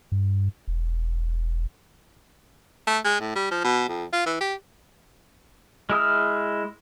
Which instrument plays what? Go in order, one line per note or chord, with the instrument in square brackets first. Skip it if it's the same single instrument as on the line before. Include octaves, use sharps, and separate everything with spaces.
[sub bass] G2
E1
[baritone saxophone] A3
G#3
A2
G3
F3
B2
F2
F4
E3
G4
[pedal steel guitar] G#3 E4 D#6 F6